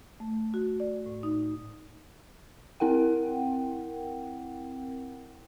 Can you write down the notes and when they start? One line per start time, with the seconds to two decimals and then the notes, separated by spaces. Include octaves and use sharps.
0.20 A3
0.54 F#4
0.80 D5
1.06 A2
1.23 D#4
2.80 C4 E4 A#4 F#5 G5